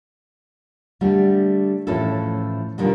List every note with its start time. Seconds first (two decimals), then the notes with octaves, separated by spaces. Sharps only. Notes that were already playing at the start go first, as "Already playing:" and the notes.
1.01 D3 G3 A3
1.87 A2 E3 F3 C#4 E4 A4
2.78 B2 D3 D#3 F3 G3